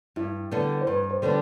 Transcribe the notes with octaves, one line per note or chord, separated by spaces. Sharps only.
G2 E4
D3 G3 B3 D4
C5
G2 B4
C5
D3 G3 B3 D4